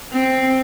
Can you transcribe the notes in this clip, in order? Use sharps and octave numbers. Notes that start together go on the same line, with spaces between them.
C4